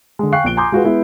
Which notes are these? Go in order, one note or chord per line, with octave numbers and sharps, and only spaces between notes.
D3 G#3
F5 G5 G#5 C#6 F#6 C7
A#1 A#2 D7 G7
G#5 A#5 C6 D6 D#6 G6
G#3 F4 F#4 G#4 B4
G#3 B3 E4